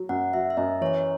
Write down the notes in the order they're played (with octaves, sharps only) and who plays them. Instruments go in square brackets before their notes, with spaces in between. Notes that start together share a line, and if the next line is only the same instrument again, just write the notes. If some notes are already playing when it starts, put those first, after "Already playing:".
Already playing: [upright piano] F#3
[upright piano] F#2 [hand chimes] F#5
[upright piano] F#3 [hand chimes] E5
[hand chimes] E5
[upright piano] F#2 [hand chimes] D#5
[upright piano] E3 [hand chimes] C#5